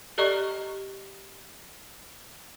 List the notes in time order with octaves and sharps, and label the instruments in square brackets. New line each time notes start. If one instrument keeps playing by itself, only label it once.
[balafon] G4 A4 D5 D#5 A#5 C#6